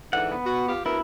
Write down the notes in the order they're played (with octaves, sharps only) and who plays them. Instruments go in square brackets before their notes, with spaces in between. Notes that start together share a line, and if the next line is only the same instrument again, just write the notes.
[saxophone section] G#2 D3 E3 [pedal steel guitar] F#5
[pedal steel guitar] B3
[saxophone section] F#4
F4 G4
[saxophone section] D2 B3 A#4 [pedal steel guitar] E4